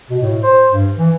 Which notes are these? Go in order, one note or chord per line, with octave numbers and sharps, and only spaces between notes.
B2
A2
C5
G2
E3